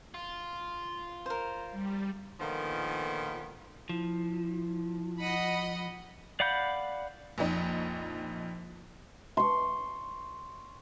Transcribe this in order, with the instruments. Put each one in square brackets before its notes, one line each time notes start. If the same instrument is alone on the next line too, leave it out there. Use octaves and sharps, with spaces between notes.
[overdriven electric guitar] F4
[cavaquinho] A#4 C5
[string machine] G3
[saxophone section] A#2 D3 D#3 F3 A#3 B3
[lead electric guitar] F3 [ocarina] E4
[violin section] D#5 F#5 B5
[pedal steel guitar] D5 F5 F#5 B5 G6
[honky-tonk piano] A#1 F2 D#4
[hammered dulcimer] C6 C#6